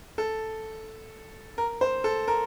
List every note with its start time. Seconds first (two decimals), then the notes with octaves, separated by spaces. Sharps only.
0.18 A4
1.58 A#4
1.81 C5
2.04 A4
2.28 A#4